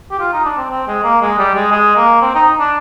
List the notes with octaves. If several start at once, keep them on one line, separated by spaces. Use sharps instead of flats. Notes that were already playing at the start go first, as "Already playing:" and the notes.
G4
F4
D#4
D4
C4
C4
G#3
A#3
G#3
G3
G#3
G#3
A#3
C4
D#4
D4